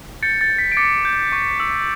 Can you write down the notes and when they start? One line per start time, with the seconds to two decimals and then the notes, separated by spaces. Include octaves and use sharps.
0.23 G6 A6 C#7
0.41 A6 C#7
0.50 G6
0.58 B6
0.72 D7
0.77 D6 A6 C#7
1.05 G6
1.32 C#6
1.60 E6